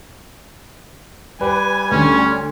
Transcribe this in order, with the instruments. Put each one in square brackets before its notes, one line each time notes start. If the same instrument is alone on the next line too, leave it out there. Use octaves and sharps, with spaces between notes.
[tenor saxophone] G3 [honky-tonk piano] B4 [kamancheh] G#5
[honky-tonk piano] D2 D3 [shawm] C#4